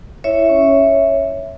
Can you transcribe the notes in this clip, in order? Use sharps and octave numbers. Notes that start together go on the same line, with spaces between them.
E4 C#5 E5
C#4